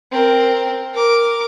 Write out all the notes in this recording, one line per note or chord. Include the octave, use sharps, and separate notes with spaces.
C4 A#4
A#4 D6